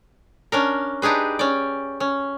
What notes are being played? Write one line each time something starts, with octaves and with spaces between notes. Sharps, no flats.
C#4 D4 A#4
D4 D#4 G4 G#4 B4
C#4 D5
C#4